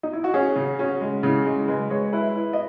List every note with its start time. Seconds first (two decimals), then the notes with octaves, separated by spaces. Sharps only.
0.03 D#4
0.13 E4
0.24 F#4
0.34 C#4 G#4
0.56 C#3
0.79 C#4 F#4
1.01 G#3
1.23 C#3 E4
1.45 G#3
1.68 G#3 B4
1.90 G#3 C#5
2.13 E4 B4
2.35 E4
2.53 D#5